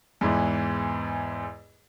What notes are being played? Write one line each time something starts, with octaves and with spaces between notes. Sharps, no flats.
E2 G#2 E3